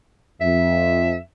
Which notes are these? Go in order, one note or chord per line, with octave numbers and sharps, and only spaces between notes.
F2 E5